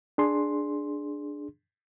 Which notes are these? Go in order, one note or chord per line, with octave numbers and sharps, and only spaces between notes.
D4 G#4 C6